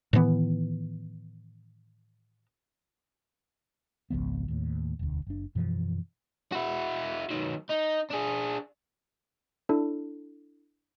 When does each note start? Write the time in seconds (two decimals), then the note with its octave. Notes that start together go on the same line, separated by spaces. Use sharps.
0.13 A2 D#3 E3 B3
4.10 G#1 C#2 F3 B3
4.48 D#2 A2
4.99 E1 D2
5.27 F#1 D4
5.55 F#2 B2 E3 F3
6.52 E4 F#4
7.30 D#3 F#3
7.69 D#4
8.10 D4 G#4
9.69 D4 E4 A4